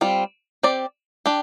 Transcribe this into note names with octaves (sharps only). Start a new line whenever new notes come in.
G3 C4 F4
C4 G4 D5
D4 G4